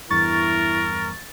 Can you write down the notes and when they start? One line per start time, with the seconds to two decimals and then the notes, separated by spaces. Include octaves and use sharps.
0.10 E2 G2 E4 A#4 C#6 A6